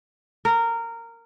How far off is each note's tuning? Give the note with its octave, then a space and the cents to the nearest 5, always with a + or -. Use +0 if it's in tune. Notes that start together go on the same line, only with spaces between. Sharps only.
A#4 -15